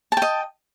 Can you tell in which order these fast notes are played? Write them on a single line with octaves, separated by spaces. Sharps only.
A5 G5 D#5